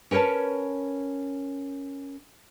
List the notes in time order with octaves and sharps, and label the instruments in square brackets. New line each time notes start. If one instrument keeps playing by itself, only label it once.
[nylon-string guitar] C#4 A#4 B4 C#5 A5